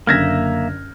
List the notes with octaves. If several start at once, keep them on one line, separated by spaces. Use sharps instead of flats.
F#1 D3 A#3 E5 F6 G#6 A#6